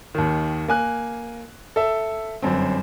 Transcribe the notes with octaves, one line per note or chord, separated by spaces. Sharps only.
D#2 D#3
A#3 G#5 F#6
A4 E5
G1 F#2 C4